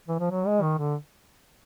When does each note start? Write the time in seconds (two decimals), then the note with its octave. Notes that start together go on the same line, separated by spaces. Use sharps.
0.08 E3
0.19 F3
0.31 F#3
0.47 G#3
0.62 D#3
0.78 D3